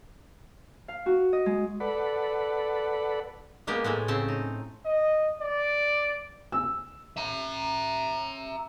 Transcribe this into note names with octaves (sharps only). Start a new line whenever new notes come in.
F5
F#4
D#5
G#3
A4 B4 D5 F#5 B5
G#3 A#3 B3 G4
A2 G#3 A3 B3
C#3 C4 A5
D#4
D#5
D5
E6
E5 A#5